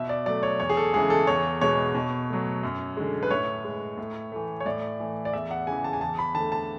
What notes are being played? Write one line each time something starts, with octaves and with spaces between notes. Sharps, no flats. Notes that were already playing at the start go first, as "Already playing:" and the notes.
Already playing: B2 E5
D5
F#3 A3 D5
C#5
E2 C#5
G#4
A4
C#3 E3 G#3 G#4
A4
E2 C#5
B2 G#3 C#5
B2
F#3 A3
F#2
D3 G#3
B4
A2 C#5
G#3
A2
E3 A3
C#5
A2 D5
E3 A3
D5
E2 E5
F#5
C#3 E3 G#5
A5
G#5
E2 A5
B5
D3 A5
A3
A5